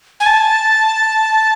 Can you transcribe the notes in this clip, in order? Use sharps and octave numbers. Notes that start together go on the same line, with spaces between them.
G#5
A5